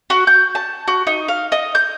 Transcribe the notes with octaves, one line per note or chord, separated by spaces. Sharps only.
F#4
G6
A5
F#4
D#4
F5
D#5
G6